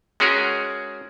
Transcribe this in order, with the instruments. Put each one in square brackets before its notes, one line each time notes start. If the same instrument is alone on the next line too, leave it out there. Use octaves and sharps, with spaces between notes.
[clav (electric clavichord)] G#3 C#4 F#4 G#4 A#4